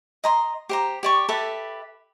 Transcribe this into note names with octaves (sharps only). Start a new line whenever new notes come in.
D#5 A#5 C6
G4 C5 A#5
G4 D5 C#6
G4 A4 B4 E5